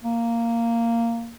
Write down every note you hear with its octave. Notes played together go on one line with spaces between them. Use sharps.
A#3